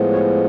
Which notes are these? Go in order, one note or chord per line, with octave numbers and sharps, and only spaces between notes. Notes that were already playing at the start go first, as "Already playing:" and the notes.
Already playing: A2 F3 G#3 B3
C#5